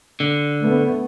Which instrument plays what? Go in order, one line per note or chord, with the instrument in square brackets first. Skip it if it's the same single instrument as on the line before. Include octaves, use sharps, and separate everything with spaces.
[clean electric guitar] D3
[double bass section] A3 B3